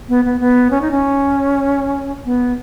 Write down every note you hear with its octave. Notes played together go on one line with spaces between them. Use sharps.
B3
B3
B3
C#4
D#4
C#4
B3